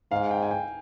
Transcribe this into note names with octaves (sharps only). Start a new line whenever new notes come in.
G#2 F5
G5
G#5
G5